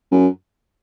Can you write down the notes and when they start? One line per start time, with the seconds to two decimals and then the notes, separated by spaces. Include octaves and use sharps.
0.12 F#2